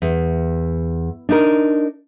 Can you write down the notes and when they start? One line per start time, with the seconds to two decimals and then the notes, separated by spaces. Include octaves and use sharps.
0.02 E2
1.29 D4 D#4 A#4